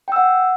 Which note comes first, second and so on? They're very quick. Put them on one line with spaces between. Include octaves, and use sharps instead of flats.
G5 E6 F#5